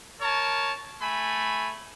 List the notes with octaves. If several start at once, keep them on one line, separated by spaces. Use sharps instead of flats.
A#4 C#5 A5
A3 G#5 B5